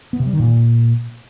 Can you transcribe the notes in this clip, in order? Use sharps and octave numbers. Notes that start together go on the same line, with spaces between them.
B3
C3
G3
D#3
A#2